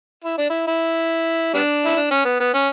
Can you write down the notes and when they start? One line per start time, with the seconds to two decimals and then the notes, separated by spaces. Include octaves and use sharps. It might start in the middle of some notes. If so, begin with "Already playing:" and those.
0.24 E4
0.38 D4
0.50 E4
0.67 E4
1.54 G3 B3 D4
1.85 E4
1.96 D4
2.11 C#4
2.25 B3
2.40 B3
2.54 C#4